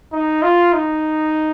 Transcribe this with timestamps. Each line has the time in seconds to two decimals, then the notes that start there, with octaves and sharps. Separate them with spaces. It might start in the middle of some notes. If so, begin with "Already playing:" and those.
0.13 D#4
0.43 F4
0.74 D#4